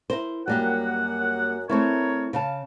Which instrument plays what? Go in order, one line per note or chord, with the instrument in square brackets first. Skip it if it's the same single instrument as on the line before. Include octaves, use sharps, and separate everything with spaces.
[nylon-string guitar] E4 A#4 C5
[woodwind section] F#2 F#5 [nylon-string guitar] G3 A#3 G4
[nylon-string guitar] A3 C4 E4 [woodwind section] A#4 C#5
[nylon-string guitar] C#3 F5 A5